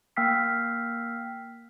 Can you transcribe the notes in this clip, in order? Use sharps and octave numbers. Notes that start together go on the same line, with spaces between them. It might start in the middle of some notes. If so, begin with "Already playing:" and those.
A#3 G5 E6 F6 B6 C7